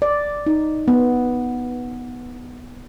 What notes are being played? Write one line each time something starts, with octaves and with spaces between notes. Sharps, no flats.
D5
D#4
B3